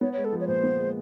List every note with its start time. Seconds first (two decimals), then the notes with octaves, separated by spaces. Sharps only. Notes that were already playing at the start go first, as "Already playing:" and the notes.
0.01 B3 C#5
0.13 G#3 C#5
0.25 A4
0.33 F3
0.40 C#5
0.48 A#2 C5
0.64 B3
0.79 G#3